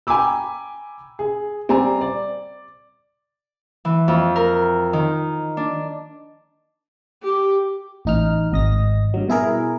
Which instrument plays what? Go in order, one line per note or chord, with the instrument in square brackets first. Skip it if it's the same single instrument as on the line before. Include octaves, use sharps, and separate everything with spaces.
[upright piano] G5 G#5 A#5 B5 D6 E6
G#4
G3 C4 D5 G#5 A#5
D5
[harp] E3
F2
A#4
D#3
D4
[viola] G4
[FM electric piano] A1 D#4 F6
G#1 D#5 A#6
G2 F#3
B2 E4 G#4 A#4